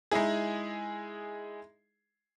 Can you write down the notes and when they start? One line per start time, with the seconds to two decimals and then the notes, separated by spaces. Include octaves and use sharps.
0.11 G#3 D#4 E4 G#4